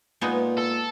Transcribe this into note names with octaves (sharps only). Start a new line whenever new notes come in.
A#2 G#3 B3 D#4
A4